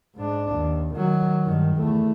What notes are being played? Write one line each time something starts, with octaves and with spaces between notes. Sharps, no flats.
G#2 D4
D#2
D#3 F#3
G2 D#3
E2 A3